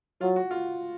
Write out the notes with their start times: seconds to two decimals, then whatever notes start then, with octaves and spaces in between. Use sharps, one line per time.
0.21 F#3 F4
0.36 F#4
0.51 F4